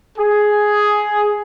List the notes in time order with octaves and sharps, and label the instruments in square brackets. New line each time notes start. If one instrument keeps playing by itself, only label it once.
[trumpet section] G#4